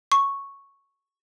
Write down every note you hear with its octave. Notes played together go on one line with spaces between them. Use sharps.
C#6